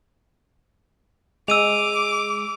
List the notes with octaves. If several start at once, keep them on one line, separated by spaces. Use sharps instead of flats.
G#3 D6 E6 D#7 F7